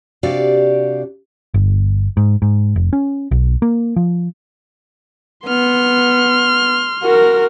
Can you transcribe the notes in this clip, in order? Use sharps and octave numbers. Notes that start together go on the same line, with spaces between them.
C3 D4 F#4 G4 D5 F5
G1
G#2
G#2
F1
C#4
B1
A#3
F3
B3 C6 F6
F#4 A#4